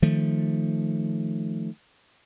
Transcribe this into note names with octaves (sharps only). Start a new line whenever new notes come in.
D#3 F3 A3